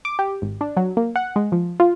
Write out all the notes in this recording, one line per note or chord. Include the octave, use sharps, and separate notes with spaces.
D6
G4
G#1
D4
F#3
A#3
F#5
G#3
F3
F4